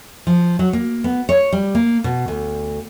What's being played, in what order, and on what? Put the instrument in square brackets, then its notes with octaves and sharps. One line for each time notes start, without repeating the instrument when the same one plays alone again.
[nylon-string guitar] F3
F#3
A#3
B3
C#5
G3
A#3
B2
D2